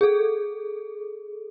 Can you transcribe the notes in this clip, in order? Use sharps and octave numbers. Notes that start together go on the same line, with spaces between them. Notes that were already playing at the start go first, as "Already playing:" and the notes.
G#4 A4